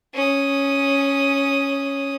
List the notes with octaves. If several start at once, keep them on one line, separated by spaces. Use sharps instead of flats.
C#4 D#6